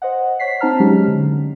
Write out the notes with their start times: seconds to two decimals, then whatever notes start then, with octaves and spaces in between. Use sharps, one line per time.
0.02 C5 D#5 F#5
0.40 C#5 F#5 B6 C7
0.61 C4 D#4 C5 A5 A#5 F6
0.80 F#3 G#3 C#4 G4
1.08 D3